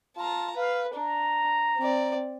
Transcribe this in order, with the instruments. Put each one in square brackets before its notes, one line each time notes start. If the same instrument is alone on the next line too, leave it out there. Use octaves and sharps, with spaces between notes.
[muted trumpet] F4 [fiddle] A5 A#5
[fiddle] B4 [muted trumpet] F5
[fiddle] D4 [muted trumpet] A#5
[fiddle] C4 D5